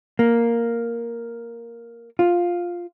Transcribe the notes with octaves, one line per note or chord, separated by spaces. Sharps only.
A#3
F4